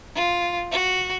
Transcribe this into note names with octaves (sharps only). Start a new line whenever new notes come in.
F4
F#4